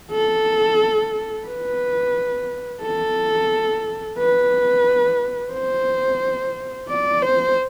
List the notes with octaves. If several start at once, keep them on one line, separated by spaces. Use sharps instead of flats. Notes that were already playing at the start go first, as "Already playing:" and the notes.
A4
B4
A4
B4
C5
D5
C5